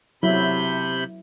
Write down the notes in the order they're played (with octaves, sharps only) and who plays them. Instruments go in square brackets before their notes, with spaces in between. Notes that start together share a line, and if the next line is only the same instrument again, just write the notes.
[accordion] C3 B5 G6 [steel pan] F#3 E4